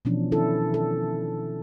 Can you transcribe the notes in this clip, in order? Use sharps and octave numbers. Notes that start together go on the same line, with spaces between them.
B2 E3 F3 C#4 D4
D#3 C#4 D4 E4 A4
A4